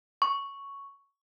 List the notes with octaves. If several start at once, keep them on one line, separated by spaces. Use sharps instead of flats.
C#6